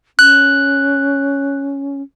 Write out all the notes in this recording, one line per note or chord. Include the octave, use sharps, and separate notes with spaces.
C#4 F#6